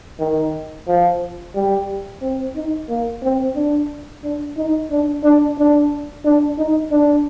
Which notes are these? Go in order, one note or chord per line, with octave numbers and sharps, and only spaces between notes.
D#3
F3
G3
C4
D#4
A#3
C4
D4
D4
D#4
D4
D4
D4
D4
D#4
D4